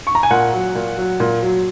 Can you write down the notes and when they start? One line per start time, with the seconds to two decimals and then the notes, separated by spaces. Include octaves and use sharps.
0.07 C#6
0.15 A#5
0.23 G#5
0.31 A#2 F#5
0.53 F#3
0.75 A#2
0.97 F#3
1.20 A#2
1.42 F#3